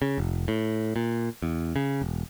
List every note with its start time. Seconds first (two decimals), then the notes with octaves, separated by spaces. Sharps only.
0.02 C#3
0.18 F1
0.48 A2
0.96 A#2
1.42 E2
1.76 C#3
2.02 E1